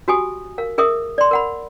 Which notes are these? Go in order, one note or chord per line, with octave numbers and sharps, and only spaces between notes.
F#4 G4 G#5 D#6
A#4 F5
G#4 A#4 E5 D#6
D5 C6
A#4 F#5 B5